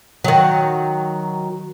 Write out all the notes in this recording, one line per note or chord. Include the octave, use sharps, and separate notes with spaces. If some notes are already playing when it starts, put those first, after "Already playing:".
D#3 F#3